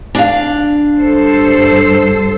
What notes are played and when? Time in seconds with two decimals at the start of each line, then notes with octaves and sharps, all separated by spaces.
0.15 D4 F5
1.00 G2 A4 C5